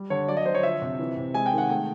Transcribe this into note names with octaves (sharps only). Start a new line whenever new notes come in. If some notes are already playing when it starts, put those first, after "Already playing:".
Already playing: G3
D3 C#5
F#3 D5
D#5
D3 C5
C#5
F3 E5
C3
E3
C3
G#3 G#5
G5
D#3
F#5
A3 G5